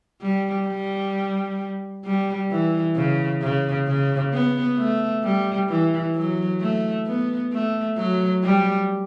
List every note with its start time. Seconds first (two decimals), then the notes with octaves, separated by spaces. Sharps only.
0.22 G3
0.68 G3
2.05 G3
2.51 E3
2.96 C#3
3.42 C#3
3.88 C#3
4.33 B3
4.78 A3
5.24 G3
5.69 E3
6.16 F#3
6.61 A3
7.07 B3
7.52 A3
7.97 F#3
8.44 G3